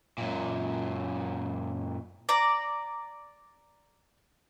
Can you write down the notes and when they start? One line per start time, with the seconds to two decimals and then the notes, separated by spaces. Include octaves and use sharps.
0.18 F#2 A#2
2.29 D5 A#5